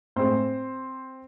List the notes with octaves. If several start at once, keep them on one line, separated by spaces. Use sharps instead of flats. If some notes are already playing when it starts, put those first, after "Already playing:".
A2 G#3 C4 C5